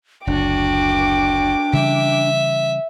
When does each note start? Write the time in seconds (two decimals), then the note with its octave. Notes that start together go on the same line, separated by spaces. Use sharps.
0.27 F#1 D2 D4 F#4 G5 D6
1.73 C#3 E3 G3 E5